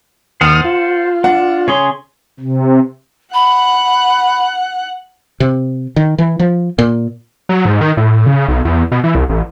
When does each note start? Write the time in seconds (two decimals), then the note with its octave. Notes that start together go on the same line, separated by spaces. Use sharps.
0.41 D#2 C5 F#5 A5 D#6 F6
0.64 F4
1.24 D4 F#5
1.68 C#3 G#4 C#5 C6
2.40 C3
3.33 F#5 B5 F#6
5.40 C3
5.96 D#3
6.18 E3
6.40 F3
6.79 A#2
7.49 F#3
7.65 G#2
7.81 D#3
7.97 A2
8.26 C#3
8.48 B1
8.65 E2
8.92 B2
9.04 E3
9.15 C2
9.29 A1